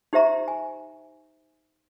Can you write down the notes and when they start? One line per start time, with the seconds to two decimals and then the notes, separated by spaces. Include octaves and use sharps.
0.13 D#4 G4 C5 E5 A#5 C#6
0.48 G#5